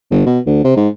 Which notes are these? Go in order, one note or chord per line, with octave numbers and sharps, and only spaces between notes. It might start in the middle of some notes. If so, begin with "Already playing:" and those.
G1
B2
D2
C3
G#2